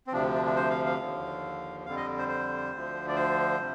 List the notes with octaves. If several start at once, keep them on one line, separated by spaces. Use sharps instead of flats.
C4
D2 C3 F3 D4
D4
D4
C5
F5
F5
D#2 D3 F3
F2 D3 G3 F5
D#5
C5
C5
D2 D3 F3
D5
C5
C3 G3